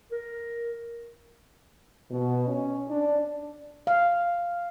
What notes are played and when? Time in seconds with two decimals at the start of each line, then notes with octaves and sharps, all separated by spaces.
0.12 A#4
2.11 B2
2.48 C#4
2.89 D4
3.87 F5